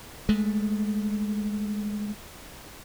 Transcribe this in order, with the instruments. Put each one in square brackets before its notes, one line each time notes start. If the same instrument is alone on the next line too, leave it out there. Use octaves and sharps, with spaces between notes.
[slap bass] G#3 A3